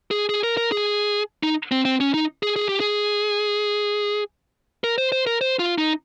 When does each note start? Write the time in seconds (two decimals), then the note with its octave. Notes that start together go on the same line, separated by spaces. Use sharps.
0.11 G#4
0.29 G#4
0.43 A#4
0.57 A#4
0.72 G#4
1.43 D#4
1.72 C4
1.85 C4
2.00 C#4
2.14 D#4
2.43 G#4
2.56 G#4
2.69 G4
2.80 G#4
4.84 A#4
4.98 C5
5.12 C5
5.27 A#4
5.41 C5
5.59 F4
5.78 D#4